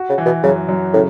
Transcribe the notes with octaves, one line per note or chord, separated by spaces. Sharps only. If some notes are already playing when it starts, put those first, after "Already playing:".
Already playing: F#4
C#3
E3
B2
F#2 C#3
F#2
A2 C#3